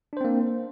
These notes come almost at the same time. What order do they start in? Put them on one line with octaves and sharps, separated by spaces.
D4 C5 C4 A#3